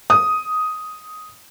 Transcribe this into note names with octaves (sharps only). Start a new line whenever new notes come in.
D#6